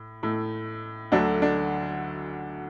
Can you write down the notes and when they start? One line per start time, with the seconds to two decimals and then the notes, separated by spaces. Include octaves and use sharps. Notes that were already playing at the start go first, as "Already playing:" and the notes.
Already playing: A2
0.23 A2 A3
1.12 D2 D3 F#3 A3 D4
1.42 D4